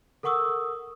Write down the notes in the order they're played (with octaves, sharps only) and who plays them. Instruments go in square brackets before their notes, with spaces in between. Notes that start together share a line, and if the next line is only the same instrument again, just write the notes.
[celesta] A4 A#4 F#5 C#6 D#6 E6